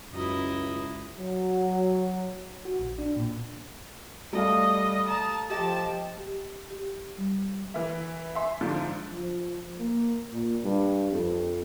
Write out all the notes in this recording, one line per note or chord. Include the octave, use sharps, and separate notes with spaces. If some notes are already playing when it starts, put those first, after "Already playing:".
C#2 F#2 E4 F#4 D#5 A#5
F#3
F#4
A#1
D4
A#2
G3 A3 D#5 F5
A5 A#5 D#6
F3 G4 D#5 G5 A5
G4
G4
G3
E3 E5
E5 G#5 C6
G#2 D3 F3
F3
A#3
A#2
G2
F2